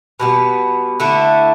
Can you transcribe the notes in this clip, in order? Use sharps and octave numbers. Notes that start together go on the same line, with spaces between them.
B2 G3 B3
D3 A3 E4